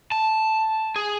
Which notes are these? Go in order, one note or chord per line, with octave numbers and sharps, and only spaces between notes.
A5
G#4